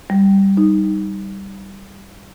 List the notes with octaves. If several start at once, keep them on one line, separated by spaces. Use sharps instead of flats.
G3
D#4